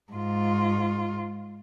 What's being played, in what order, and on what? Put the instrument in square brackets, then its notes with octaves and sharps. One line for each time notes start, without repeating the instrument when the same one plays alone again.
[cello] G#2 F4